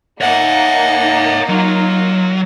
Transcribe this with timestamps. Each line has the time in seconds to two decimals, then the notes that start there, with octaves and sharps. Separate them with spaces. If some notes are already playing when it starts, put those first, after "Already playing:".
0.21 A#3 D#4 C#5 E5 F#5
1.49 F#3 F4